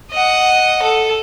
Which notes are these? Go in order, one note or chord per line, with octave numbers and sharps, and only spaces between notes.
D#5 F#5
A4